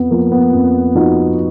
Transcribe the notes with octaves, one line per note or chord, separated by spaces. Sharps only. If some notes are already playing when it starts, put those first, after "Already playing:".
Already playing: F2 B3
F3 A#3
B3
F2
F3 D#4 F#4